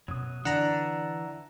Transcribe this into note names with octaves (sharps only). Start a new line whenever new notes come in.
F#2 B2 F#3 D#6
D3 E3 D4 F#5 A#5